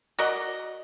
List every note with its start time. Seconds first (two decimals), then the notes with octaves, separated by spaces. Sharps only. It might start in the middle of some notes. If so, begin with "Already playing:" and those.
0.19 F#4 A#4 D5 D#5